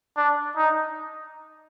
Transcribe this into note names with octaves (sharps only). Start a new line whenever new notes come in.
D4
D#4